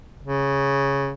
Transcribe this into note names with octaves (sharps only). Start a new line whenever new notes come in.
C#3